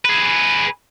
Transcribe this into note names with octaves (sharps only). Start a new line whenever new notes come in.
G#4 B4